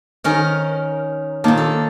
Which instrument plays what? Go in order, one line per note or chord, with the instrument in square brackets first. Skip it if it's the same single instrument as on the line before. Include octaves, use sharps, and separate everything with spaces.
[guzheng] D#3 C#4 A#4
[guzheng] A#2 D#3 [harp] A#3 D4 A5
[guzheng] A4